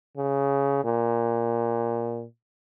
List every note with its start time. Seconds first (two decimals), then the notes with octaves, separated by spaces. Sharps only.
0.17 C#3
0.84 A#2